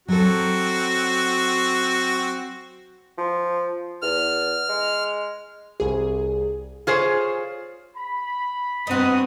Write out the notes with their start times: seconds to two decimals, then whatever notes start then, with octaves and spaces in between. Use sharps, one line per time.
0.08 F#3 C4 F#4 A4
3.18 F3
4.02 E2 F6
4.69 G#3
5.80 C2 G#4
6.87 F4 G#4 C5 C#5
7.96 B5
8.87 G2 B3 C4 D#4 F#4 D#6